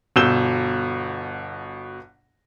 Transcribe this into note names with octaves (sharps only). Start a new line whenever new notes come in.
G1 B2 E6 G6 E7 G7